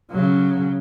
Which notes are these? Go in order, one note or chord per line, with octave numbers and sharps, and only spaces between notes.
C#3 F#3